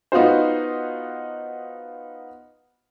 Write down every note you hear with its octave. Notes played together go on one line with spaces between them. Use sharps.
B3 D#4 F4 F#4 C5